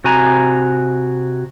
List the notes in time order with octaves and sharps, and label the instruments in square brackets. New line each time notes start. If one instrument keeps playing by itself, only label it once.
[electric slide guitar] C3 F#4 G#5 A#5